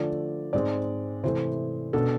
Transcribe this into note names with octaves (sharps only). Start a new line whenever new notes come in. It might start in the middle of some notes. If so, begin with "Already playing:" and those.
Already playing: D3 F3 A3 D5
G#2 G#3 C4 D5
C3 E3 A3 C5
B2 B3 D4 A4